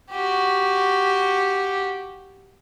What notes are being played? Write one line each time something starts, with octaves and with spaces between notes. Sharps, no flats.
F#4 G4